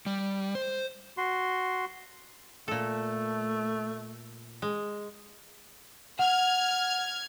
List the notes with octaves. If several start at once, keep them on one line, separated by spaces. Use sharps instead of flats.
G3
C5
F#4 C6
A#2 A3 A4
G#3
F#5 F6 G#6